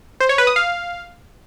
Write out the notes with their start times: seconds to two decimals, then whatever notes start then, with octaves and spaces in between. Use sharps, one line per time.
0.20 C5
0.29 C#5
0.38 B4
0.47 D#6
0.56 F5